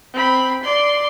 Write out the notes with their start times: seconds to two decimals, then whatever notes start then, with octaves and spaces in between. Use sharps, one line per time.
0.14 C4 B5
0.63 D5 C6